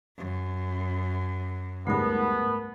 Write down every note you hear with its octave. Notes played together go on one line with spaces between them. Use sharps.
F#2
C#2 G#2 G3 A3 B3 A#4